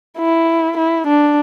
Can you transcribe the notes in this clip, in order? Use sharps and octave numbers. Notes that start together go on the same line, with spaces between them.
E4
E4
D4